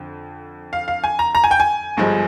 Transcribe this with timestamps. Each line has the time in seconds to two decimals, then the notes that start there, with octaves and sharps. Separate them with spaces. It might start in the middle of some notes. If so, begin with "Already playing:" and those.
Already playing: F2 D3
0.73 F5
0.88 F5
1.04 G#5
1.19 A#5
1.35 A#5
1.44 G#5
1.51 G5
1.60 G#5
1.97 G1 G2 F3 G#3